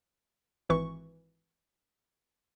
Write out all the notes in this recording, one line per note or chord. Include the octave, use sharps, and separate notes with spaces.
G#1 E3 C#6